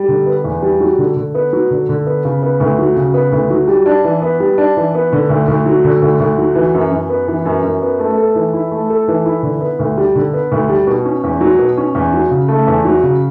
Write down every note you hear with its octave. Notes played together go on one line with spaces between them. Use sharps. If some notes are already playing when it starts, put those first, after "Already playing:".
Already playing: G3
D3
B3
E2
G3
F#3
D3
D3
B3
F#3
D3
D3
B3
C#3
B3
D2
F#3
C#3
B3
D2
F#3
G3
D4
E3
B3
G3
D4
E3
B3
D3
D2
D2
F#3
D3
D2
D2
F#3
E3
F#2
F#2
B3
E3
F#2
F#2
B3
A3
A4
E3
E4
A3
A4
E3
E4
D3
B3
D2
G3
D3
B3
D2
G3
B2
C#4
E2
F#3
B2
C#4
E2
F#3
C#3
A3
E2
F#3
C#3